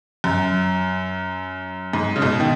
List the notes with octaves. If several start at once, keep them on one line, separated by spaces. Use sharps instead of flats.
F#2
G#2
C#3
B2
D#3